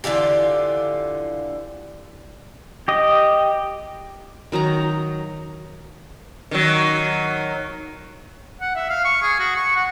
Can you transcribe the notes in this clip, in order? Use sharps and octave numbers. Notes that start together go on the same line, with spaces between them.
D3 E3 F4 G4
G4 D#5
D#3 F#3 D#4 A#5
D#3 F#3
F#5
E5
F5
C#6
G#4
F#4
C#6
F#5